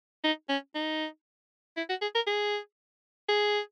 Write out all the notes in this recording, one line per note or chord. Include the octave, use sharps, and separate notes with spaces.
D#4
C#4
D#4
E4
F#4
G#4
A#4
G#4
G#4